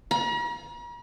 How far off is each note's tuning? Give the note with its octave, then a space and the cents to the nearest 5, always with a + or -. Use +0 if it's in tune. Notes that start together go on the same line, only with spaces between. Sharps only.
A#5 +45